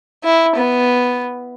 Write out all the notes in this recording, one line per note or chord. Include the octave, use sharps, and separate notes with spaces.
E4
B3